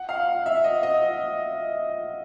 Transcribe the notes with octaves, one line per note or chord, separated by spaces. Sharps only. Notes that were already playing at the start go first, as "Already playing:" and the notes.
Already playing: F#5
F5
E5
D#5
D#5